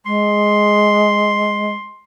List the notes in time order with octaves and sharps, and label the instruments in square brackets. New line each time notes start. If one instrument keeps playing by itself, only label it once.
[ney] G#3 [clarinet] C6